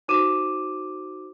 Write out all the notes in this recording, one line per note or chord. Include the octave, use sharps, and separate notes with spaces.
D#4 F#4 C5 D6 D#7 E7